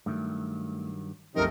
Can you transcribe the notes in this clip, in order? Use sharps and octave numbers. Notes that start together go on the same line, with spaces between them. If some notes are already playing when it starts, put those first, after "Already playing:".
G2 D#3 F#3 A3
C2 F#2 C3 F3 A3 D#4 A#4